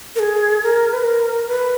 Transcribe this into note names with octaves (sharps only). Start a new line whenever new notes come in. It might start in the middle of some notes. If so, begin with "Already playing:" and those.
A#4
G#4
A#4
B4
A#4
B4